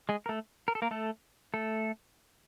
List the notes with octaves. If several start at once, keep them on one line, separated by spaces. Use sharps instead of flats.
G#3 G#4
A#4
A3 A4
A#4
A4
A#3 A#4
A3 A4
A3 A4